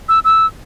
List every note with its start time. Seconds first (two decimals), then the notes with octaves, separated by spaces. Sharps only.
0.09 E6
0.25 E6